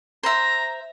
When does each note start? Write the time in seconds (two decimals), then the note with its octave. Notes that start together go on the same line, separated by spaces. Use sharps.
0.23 C5 E5 A#5